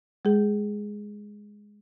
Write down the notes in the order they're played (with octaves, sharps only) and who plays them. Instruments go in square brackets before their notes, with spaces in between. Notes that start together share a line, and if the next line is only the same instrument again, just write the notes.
[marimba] G#3 G#4